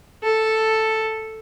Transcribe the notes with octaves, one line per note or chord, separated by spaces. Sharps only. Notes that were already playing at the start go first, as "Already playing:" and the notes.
A4